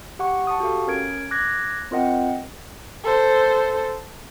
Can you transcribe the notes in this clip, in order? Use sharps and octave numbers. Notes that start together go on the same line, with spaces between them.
G4 F#5 C#6
A5 C#6 D#6
F#4 G4 A4 F5
C#4 A#4 G#6 D7
D6 F#6 G#6 A#6
C4 F4 A#4 D#5 F#5 G5
A4 C5